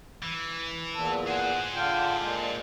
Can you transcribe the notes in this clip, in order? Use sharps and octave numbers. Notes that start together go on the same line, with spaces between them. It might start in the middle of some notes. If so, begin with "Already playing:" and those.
E3
E2 A#2 A4
G#4 C5 F#5
D3 D4 F4 G5
A#2 G#3